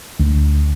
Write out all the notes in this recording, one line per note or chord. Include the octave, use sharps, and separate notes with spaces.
D2